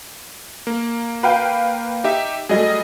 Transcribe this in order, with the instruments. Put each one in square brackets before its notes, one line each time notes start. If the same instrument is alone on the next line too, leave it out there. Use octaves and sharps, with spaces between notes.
[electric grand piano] A#3
[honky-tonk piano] B4 F5 G5
[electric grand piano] D#4 G4 E5
[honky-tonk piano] F#3 G3 A3 [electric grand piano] G#4 D#5